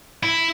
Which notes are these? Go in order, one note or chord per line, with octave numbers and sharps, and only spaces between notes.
E4